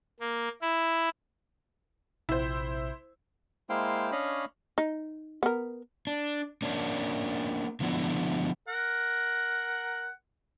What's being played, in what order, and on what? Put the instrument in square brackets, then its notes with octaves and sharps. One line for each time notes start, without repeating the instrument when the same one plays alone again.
[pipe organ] A#3
E4
[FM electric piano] A#1 C3 [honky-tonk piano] E4 C5
[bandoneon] G#3 A#3 E4 C5 F5 G5
C#4 D4 C#5 D#5 F5 B5
[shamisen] D#4
B3 A#4
[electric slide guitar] D4
A#3 C#4 D4
D3 F3 B3 D4 E4
[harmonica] A#4 F#5